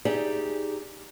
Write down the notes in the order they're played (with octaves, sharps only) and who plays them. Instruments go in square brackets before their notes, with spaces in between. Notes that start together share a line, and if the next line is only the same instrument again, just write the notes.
[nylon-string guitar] D#4 G4 G#4 D5 E5